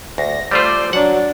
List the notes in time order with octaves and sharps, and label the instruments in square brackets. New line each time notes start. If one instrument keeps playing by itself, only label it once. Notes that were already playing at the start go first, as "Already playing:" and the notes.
[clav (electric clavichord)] D2 [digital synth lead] A#6
[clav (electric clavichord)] G3 A3 F4 [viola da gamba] C5 [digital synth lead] D5
[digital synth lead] F#3 [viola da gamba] D4 [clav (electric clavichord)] F#5